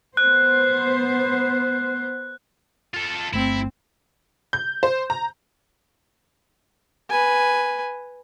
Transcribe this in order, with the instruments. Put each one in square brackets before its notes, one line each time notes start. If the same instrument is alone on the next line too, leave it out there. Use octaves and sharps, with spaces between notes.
[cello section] B3 C5 [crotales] F#6
[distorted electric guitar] F4 A4
[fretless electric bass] G1 A3 [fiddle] C4 [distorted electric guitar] E4
[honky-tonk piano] G6
C5
A#5
[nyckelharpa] B4 G#5